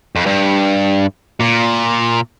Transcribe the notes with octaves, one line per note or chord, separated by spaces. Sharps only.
F2
G2
A#2